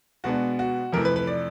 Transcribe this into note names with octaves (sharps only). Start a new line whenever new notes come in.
B2 G#3 B3 D4 F#4
F#4
F2 C3 E3 A3 A#4
B4
B4
D5